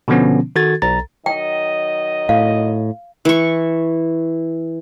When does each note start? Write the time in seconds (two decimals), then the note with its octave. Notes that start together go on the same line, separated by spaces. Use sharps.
0.08 B2 D3 F3 B3 C#4
0.56 D#3 F#4 A4 G#6 A6
0.82 B1 A#5 A6
1.26 D#3 F#3 D#5 G5
2.29 A2 F5
3.25 E3 C#6